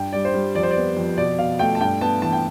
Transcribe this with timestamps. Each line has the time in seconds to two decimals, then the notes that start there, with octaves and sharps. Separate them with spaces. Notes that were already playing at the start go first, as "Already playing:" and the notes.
Already playing: G2 G5
0.13 G3 D5
0.25 C5
0.34 G3
0.55 F2 D5
0.63 C5
0.71 D5
0.77 B3
0.97 F2
1.18 B2 D5
1.39 B2 F5
1.59 A3 G5
1.75 A5
1.80 G2 G5
2.01 B3 A5
2.22 E3 A5
2.32 G5